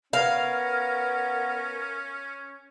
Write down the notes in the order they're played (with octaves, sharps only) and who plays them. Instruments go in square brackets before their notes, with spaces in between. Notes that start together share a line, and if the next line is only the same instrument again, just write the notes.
[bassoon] B3 [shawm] C#4 [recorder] A#4 [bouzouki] F5